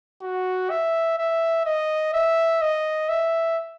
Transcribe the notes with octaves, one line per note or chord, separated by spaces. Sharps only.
F#4
E5
E5
D#5
E5
D#5
E5